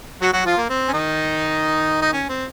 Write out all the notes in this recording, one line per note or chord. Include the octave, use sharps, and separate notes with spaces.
F#3 F#4
F#3 F#4
F3 F4
A#3
C4
C#4
D#3 D#4
D#4
C#4
C4